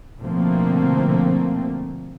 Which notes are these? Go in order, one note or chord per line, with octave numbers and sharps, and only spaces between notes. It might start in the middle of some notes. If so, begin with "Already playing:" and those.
B2 D3 F3 A3 A#3 C4